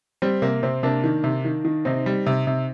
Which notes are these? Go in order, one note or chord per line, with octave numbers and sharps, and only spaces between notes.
G3 C4
C3 A#3
C3 C4
C3 A#3 D4
D#3
C3
D#3
D#3
C3 C4 D#4
G3
C3
C3